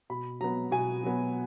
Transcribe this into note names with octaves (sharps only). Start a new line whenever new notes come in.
B2 B5
F#3 B3 A#5
B2 G#5
F#3 B3